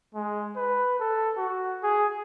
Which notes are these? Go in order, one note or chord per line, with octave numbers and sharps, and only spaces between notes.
G#3
B4
A4
F#4
G#4